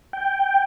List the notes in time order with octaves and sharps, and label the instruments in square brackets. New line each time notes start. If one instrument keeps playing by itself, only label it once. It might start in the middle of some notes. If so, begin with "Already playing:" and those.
[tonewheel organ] G5